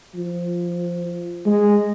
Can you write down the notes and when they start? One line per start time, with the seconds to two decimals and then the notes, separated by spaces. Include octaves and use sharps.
0.15 F3
1.46 G#3